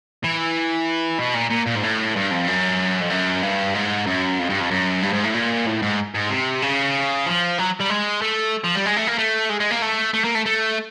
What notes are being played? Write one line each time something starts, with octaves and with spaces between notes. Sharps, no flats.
E3
B2
A#2
A#2
A#2
G#2
A2
G2
F2
F#2
F2
F#2
G2
G#2
F#2
F2
G2
F2
F#2
G2
G#2
A2
A#2
A2
G#2
G#2
C3
C#3
F3
F#3
G3
G#3
A3
F3
G3
G#3
A3
A#3
A3
G#3
G#3
A#3
A3
A3
A#3
A3
A3